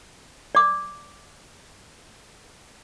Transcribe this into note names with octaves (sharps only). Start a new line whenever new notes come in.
D5 D6